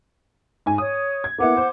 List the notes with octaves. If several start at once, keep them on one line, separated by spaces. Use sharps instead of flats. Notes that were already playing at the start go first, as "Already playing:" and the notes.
G#2 G#5
C#5 D#6
G#6
A#3 B3 E4 F#5 D6
C5